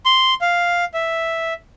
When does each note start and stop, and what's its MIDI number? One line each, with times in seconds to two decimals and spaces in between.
0.06 0.34 84
0.41 0.85 77
0.94 1.54 76